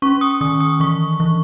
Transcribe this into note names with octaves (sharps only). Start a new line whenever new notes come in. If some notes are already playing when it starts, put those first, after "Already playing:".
C#4 C#6
D#6
D#3 D#6
D#6
E3 C#6
E3